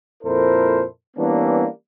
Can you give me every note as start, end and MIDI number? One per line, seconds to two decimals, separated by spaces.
0.23 0.83 41
0.23 0.83 46
0.23 0.83 64
0.23 0.83 69
0.23 0.83 70
0.23 0.83 72
1.16 1.65 52
1.16 1.65 55
1.16 1.65 58
1.16 1.65 59
1.16 1.65 61
1.16 1.65 62